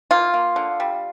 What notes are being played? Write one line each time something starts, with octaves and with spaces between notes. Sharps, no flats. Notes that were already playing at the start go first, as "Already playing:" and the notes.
A#3 F4
A#3
D3
G3